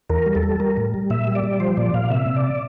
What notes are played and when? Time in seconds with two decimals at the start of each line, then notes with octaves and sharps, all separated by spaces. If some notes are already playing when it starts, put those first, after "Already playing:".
0.10 E2 A#4
0.26 G3
0.35 A4
0.43 G3
0.60 G3 A#4
0.77 A2
0.94 G3
1.10 A#2 E5
1.27 G3
1.35 D5
1.44 G3
1.60 F3 C5
1.77 A#2 D5
1.94 A#2 F5
2.10 C3 E5
2.27 C3
2.36 D5